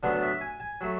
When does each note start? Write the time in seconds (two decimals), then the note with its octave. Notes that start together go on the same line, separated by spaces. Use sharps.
0.03 D2 D3 F#3 B3 D4 D5
0.22 E5
0.41 G#5
0.60 G#5
0.81 F#3 A3